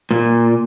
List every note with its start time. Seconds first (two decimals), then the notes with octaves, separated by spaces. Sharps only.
0.11 A#2